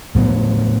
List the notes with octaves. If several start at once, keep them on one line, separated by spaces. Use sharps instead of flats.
A2 F#3 B3